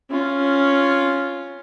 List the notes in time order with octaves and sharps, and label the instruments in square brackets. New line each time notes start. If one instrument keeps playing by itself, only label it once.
[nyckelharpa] C#4 F4